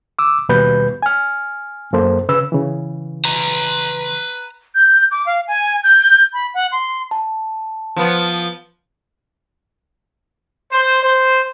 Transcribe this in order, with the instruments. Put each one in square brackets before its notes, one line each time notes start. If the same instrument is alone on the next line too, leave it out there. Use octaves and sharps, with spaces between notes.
[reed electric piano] D6 E6
D#2 B2 G3 B4 G6
G#5 F6
F#2 A#3 A4 C5
C#3 B4 E6
C#3 E3
[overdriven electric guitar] B4 A#5
[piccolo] G6
D6
F5
G#5
G6
B5
F#5
C6
[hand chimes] A5
[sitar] F3 B3
[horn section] C5
C5